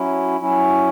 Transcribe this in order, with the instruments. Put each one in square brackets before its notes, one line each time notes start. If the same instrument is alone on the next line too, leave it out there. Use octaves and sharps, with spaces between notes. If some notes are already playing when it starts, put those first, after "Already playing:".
Already playing: [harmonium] F#3 C#4 E4
F#3 C#4 E4